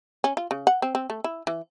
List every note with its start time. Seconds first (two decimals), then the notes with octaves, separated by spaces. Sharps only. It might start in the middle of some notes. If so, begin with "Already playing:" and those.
0.24 C#4
0.37 F4
0.51 C#3
0.67 F#5
0.82 C4
0.95 C4
1.10 A3
1.24 E4
1.47 E3